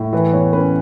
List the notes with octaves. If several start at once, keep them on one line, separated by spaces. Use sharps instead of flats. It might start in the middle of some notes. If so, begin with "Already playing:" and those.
Already playing: A2
E3 B4
E2 C#5
C#4 B4